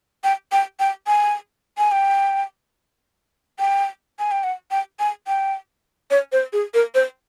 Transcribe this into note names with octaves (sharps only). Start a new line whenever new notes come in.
G5
G5
G5
G#5
G#5
G5
G5
G#5
G5
F#5
G5
G#5
G5
C#5
C5
G#4
A#4
C5